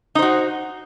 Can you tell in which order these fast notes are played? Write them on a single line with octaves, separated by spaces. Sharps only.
D#4 C5 F#4